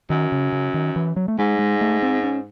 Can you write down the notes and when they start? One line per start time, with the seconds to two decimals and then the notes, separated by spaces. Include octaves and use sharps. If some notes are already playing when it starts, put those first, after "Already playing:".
0.10 F#2 D#3
0.32 C#3
0.52 C#3
0.74 D#3
0.96 E3
1.16 F#3
1.28 A3
1.39 G#2 G#3
1.59 G#3
1.81 A3
2.03 C4
2.23 C#4